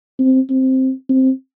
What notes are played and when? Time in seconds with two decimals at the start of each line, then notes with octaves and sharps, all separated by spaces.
0.19 C4
0.50 C4
1.09 C4